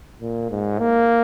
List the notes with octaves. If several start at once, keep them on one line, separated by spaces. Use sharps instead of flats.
A#2
G#2
A#3